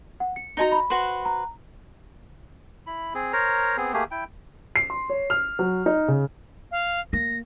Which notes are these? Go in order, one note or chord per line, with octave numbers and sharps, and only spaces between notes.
F#5
C#7
D#4 F#4 D#5 G#5 A#5 C#7
B5
F#4 B4 C5 C6
A#5
E4 B5
C4 G#4
A#4 C5 C#5 A#5
B3 C4 G#4
A3 A#3 G4 G#4
E4 G5
C7
C6
C#5
F6
F#3
D#4
C#3
F5
A#3 A#6